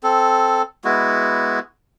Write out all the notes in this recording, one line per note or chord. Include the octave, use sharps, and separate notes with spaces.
C4 A4
G#3 B3 E4 F#4